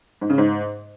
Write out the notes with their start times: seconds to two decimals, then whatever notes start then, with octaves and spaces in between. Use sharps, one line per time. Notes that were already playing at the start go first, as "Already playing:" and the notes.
0.21 G#2
0.30 C#3
0.38 G#2